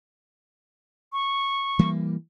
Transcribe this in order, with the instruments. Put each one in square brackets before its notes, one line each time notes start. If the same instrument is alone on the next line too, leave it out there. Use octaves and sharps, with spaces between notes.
[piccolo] C#6
[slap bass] E3 G3 A#3